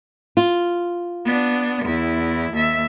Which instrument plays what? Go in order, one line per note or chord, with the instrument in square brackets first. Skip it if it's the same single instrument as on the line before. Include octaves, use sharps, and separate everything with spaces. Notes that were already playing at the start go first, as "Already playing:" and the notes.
[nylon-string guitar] F4
[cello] B3 D4
E2 E4
D#2 E5